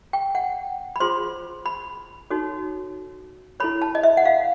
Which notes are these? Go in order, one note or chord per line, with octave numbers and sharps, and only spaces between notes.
G5
F#5
B5
F4 G#4 C5 C6
B5
D#4 F#4 A4 C#5
E4 A4 C#5 B5
A5
D#5
E5
F#5
F5